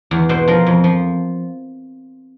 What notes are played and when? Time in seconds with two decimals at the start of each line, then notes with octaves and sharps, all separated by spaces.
0.11 E2
0.29 B2 C5
0.48 F3 A#4
0.66 F2
0.84 F3